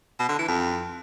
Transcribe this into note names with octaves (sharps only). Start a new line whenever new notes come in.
B2
D3
E3
F2